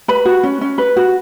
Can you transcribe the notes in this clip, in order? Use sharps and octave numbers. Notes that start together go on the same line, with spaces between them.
B4 B5
F#4
C#4
C#4
B4
F#4